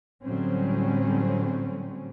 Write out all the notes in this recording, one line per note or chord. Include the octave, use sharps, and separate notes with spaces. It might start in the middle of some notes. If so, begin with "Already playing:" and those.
A2 D3 F#3 G3 C4 C#4